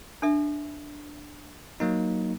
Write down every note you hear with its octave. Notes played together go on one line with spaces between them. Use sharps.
D4 A4 E5
F#3 A#3 D#4